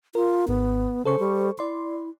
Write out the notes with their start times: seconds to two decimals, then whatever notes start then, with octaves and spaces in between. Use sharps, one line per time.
0.15 F4 A#4
0.48 G#1 B3
1.05 C#3 A4 C5 C#6
1.19 G3
1.59 E4 D5 C6